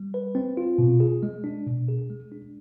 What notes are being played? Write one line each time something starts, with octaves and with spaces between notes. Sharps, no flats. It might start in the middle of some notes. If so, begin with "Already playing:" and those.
Already playing: G3
B4
C4
F4
B2
G#4
G#3
D4
B2
G#4
G#3
D4